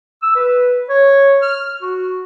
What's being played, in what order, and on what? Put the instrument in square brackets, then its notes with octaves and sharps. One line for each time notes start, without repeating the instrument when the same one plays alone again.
[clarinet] E6
B4
C#5
F6
F#4